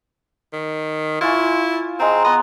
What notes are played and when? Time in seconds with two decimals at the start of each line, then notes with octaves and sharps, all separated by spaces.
0.53 D#3
1.21 E4 F4 C#5 G#5
2.00 G#3 C4 A#5
2.25 B3 D#5